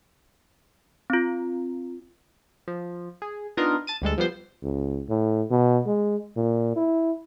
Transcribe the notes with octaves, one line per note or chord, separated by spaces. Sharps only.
C4 F4
F3
G#4
B3 D4 D#4 F4 A#4 D#5
A5 A6 D#7
D2 G3 G#3 A4
F3 G3 B3 C5
C#2
A2
B2
G#3
A#2
E4